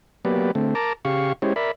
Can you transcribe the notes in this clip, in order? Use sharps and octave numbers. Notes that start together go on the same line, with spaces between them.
F#3 A#3 B3 G4 B4 D5
D3 A3 C4
A#4 A5 A#5 D6
C#3 G4 F5 C#6
G#3 C#4 E4 G4 C5 C#5
A#4 D5 E5 B5